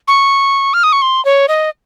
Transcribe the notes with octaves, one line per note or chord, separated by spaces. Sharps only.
C#6
F6
D#6
C#6
C6
C#5
D#5